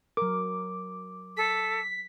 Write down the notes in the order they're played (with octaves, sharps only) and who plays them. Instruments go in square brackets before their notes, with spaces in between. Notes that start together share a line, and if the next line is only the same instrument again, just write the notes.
[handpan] F#3 A#4 [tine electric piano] D6
[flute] A4 [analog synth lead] B6